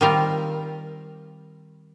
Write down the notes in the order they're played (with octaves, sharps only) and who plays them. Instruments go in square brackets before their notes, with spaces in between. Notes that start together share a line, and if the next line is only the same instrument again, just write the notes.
[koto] D#3 G3 C4 F4 A#4